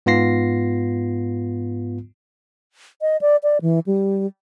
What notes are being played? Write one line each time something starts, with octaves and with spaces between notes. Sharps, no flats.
G#2 B3 F4 A#6 C7
D#5
D5
D5
E3
G3